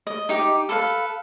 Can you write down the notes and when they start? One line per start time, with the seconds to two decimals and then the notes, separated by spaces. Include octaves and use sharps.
0.07 D#5
0.29 D#4 G4 D6
0.69 A4 B4 F5